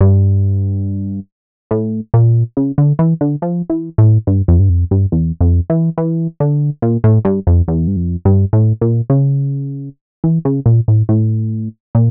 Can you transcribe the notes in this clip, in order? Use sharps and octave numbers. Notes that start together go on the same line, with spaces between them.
G2
A2
A#2
C#3
D3
E3
D3
F3
E3
A2
G2
F2
G2
F2
G2
E2
F2
E3
E3
D3
A#2
A2
G2
F2
E2
G2
F2
G2
A2
A#2
C#3
E3
C#3
A#2
A2
A2
A#2